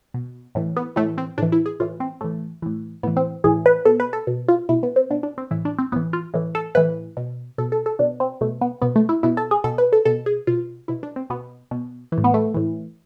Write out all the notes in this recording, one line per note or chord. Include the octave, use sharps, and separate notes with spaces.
B2
A2 E3
B3
A2 E3 A3
C4
A2 E3 D4
E4
G#4
A2 E3 F4
C4
A2 E3 A3
A2 E3
A2 E3 B3
C4
A2 E3 G#4
B4
B2 A4
B4
A4
B2
F4
B2 E4
B3
C4
B2 D4
D4
C4
A2 E3 E4
D4
C4
A2 E3 B3
F4
A2 E3
A4
A2 E3 B4
B2
B2 A4
A4
A4
B2 D4
C4
B2 A3
B3
B2 B3
A3
E4
B2 E4
A4
G#4
B2 A4
B4
A4
B2 A4
G#4
B2 F4
B2 E4
D4
C4
B2 B3
B2
E3
A2
B3
A3
A2 E3